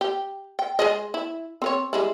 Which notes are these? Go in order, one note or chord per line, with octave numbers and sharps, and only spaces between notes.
G4
G5
G#3 G#4 D#5
E4
C4 A#4 C#5
G3 G#3 E4